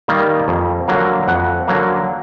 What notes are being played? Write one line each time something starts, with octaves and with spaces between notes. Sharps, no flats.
D#3 G3 A#3
F2
D3 F#3 A#3
F2 F#5
D3 F#3 A#3